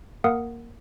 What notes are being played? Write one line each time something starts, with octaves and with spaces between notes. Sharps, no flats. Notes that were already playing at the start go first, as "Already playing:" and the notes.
A#3 A#4 F5 F#5 D#6